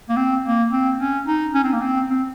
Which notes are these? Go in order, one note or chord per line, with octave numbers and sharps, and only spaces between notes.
A#3
C4
A#3
C4
C#4
D#4
C#4
C4
A#3
C4
C4